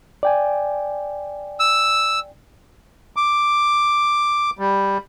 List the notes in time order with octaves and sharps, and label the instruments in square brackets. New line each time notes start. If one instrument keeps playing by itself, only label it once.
[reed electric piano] D5 G5 G#5
[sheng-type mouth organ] E6
[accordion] D6
G3